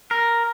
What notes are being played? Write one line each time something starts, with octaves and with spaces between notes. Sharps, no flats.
A#4